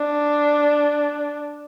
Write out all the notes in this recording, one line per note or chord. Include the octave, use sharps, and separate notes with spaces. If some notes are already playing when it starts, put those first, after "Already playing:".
Already playing: D4